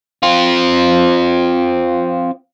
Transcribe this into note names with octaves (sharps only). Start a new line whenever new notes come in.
C4 F4